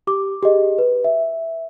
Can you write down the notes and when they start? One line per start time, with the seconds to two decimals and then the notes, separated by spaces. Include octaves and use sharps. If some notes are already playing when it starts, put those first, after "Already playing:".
0.07 G4 D6
0.43 G4 G#4 D#5
0.78 B4
1.04 E5